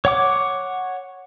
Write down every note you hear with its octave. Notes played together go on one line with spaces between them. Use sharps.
C#5 F#5 D6